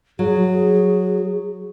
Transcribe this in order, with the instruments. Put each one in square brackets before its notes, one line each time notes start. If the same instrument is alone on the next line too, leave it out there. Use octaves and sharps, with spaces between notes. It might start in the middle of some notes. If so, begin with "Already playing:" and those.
[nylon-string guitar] F#3 [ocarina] G#4